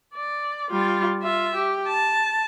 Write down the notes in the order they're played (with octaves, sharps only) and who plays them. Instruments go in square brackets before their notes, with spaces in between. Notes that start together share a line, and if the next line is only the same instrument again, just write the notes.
[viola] D5
G3 F4
F4 E5
G4
A5